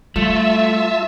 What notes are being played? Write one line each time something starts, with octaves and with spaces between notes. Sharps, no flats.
G3 A3 F4 E5 A5 E6